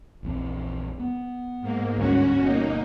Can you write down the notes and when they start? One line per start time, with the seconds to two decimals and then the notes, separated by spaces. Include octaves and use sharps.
0.23 A#1 E2 C4
1.00 B3
1.61 G#2 A#3
1.98 D2 G2 C#4 F#4
2.43 G1 B2 A#3 D#4